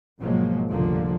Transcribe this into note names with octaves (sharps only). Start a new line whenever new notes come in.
G#1 B2 F3 F#3 G#3 A#3
F1 C#2 G2 D3 F3 A#3